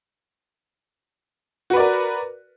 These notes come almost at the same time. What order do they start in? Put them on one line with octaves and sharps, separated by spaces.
F#4 B4 D5 A#4